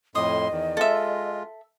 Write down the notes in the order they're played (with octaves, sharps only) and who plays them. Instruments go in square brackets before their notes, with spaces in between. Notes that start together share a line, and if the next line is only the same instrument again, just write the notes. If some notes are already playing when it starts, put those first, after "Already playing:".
[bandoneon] F2 A2 C6 [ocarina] D#5 [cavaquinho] D#6
[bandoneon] E2 D#3
[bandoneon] G#3 F4 [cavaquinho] A4 E5